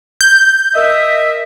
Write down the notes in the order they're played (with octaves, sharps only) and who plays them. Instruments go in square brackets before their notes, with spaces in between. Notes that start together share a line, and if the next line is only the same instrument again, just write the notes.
[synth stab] G6
[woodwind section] A#4 D#5 E5